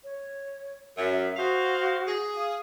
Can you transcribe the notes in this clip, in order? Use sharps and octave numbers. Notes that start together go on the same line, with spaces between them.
C#5
F#2 E5
F#4 G#4 C5 F5
G#4
F5 D#6